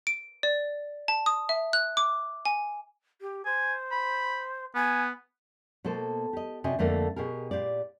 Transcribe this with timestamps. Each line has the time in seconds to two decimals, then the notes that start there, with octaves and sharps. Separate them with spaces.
0.07 D7
0.43 D5
1.08 A5
1.26 D#6
1.49 E5
1.73 F#6
1.97 D6
2.45 G#5
3.21 G4
3.45 C5 G#5
3.92 B5
4.75 B3 G#5
5.84 B2 A#3 A4 C5
6.33 G4 D#5
6.64 C3 D4 F#4 D#5 G#5
6.79 F2 D3 A3 A#3 A#4
7.16 B2 G4 G#4 A#4
7.51 A#2 G4 C5 D5